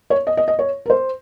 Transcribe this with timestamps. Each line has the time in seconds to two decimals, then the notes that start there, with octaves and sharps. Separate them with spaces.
0.10 C#5
0.27 D#5
0.37 D#5
0.48 D#5
0.59 C#5
0.86 A#4
0.90 C5